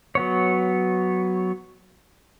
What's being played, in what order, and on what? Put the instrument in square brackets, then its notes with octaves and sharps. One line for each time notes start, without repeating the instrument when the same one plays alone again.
[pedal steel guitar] F#3 B3 C#5